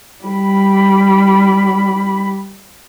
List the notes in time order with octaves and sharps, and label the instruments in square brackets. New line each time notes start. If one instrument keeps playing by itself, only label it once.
[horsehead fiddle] G3 B5